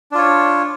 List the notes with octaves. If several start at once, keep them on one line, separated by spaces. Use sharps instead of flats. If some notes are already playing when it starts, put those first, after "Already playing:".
D4 F4 C#5